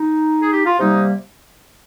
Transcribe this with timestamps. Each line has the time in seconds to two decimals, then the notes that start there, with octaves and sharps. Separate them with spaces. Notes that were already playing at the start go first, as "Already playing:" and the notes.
Already playing: D#4
0.40 G#4
0.53 G4
0.66 F4
0.79 C3 G3 A#3 D#4